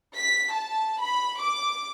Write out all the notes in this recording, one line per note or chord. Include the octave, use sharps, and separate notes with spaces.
B6
A5
B5
D6